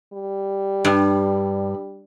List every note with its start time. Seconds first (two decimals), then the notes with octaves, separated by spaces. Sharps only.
0.13 G3
0.85 G2